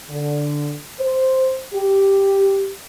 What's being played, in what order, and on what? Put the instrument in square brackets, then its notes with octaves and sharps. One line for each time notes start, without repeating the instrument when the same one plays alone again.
[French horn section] D3
C5
G4